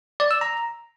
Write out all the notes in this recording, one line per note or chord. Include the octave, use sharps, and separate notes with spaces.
D5
E6
A#5